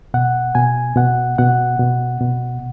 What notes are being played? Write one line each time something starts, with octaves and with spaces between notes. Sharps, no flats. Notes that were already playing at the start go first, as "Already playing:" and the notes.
B2 F#5
B2 G#5
B2 F#5
B2 F#5
B2
B2